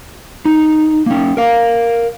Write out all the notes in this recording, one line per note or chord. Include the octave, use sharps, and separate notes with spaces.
D#4
A#3 C#4
A#4 F5